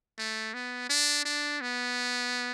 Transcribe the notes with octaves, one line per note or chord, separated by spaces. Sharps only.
A3
B3
D4
D4
B3